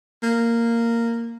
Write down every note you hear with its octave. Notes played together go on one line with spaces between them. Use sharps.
A#3